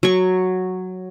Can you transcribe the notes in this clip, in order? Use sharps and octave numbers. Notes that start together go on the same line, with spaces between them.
F#3 C#6